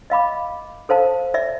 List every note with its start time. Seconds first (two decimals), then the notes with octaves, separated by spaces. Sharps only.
0.10 D#5 F5 B5 D6
0.89 A4 C5 F5 A5
1.34 D5 E5